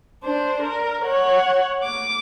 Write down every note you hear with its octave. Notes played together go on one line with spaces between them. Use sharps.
D4 C5
A#4
C#5 F#5
D6